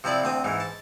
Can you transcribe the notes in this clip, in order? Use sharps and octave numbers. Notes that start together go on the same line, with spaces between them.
C3 F3 E4 D5
D2 C4 D#6
G#2 E3
A5